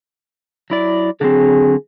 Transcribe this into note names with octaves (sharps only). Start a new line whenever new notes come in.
F#3 E4 D5
D3 F#3 C4 G#4